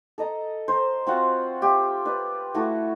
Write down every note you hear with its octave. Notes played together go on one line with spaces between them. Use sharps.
A4 D#5 A#5
C5 A#5
C4 F4 F#4 F#5
F4 G4 E5
B4 D5
A3 E4 F#4 A4